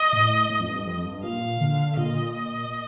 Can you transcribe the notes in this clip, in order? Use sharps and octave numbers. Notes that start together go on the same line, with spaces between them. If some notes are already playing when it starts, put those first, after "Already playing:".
Already playing: D#5
A2
A2
F2
G2
F2
G2
A#2 F5
D3
A#2 D#5